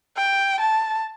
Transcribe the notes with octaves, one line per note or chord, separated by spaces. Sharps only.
G5
A5